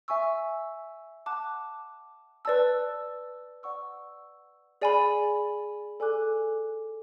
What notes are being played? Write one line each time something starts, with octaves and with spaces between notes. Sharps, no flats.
E5 G#5 C#6 E6
F#5 A5 D6 F#6
B4 D5 A5 E6
D5 F#5 C#6 E6
G#4 D5 G#5 B5
A4 D5 G#5 D6 F#6